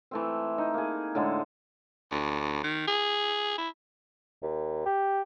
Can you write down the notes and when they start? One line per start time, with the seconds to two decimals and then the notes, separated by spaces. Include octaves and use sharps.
0.11 E3 A3 C4
0.58 D#4
0.74 A#3 G#4
1.15 A2 D3 G#3 A4
2.12 D2
2.64 D#3
2.87 G#4
3.58 E4
4.43 D#2
4.86 G4